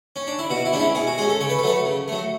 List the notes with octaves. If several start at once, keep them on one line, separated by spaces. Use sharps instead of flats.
C#4
D4
E4
B2 F#4
E4
G#3 C#4 D4
E4
B2 G#4
F#4
G#3 C#4 G#4
A4
C#3 C#5
B4
A4
F#3 A3 B4
C#3
F#3 A3